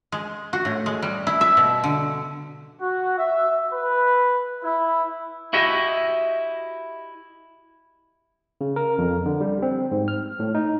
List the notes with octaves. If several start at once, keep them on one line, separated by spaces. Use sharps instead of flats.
G#3
F#4
A2
G#3
G3
E4
E5
B2
D3
F#4
E5
B4
E4
E4 F#4 G4 D#5 E5
C#3
A#4
F2
D3
G3
C4
G#2
F6
A2
D#4